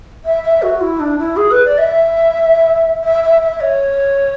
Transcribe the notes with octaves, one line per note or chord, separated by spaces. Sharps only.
E5
E5
F#4
E4
D4
E4
G#4
B4
D5
E5
E5
E5
E5
C#5